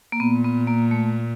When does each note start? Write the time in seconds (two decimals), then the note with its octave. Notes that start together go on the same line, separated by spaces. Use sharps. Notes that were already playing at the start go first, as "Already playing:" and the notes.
0.12 A#3
0.20 A#2 B3
0.44 B3
0.67 A#3
0.91 A3